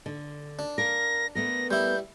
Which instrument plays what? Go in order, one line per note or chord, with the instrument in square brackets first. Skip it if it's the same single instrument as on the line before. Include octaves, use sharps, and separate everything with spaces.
[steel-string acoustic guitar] D3
[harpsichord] D4
[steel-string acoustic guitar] A#4 F5 [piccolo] A#6
[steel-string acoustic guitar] A3 B3 A#4 [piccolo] A#6
[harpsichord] G3 E4 [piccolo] G6